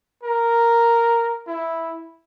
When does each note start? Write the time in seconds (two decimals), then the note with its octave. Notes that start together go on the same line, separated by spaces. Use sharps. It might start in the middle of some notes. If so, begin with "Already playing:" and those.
0.23 A#4
1.47 E4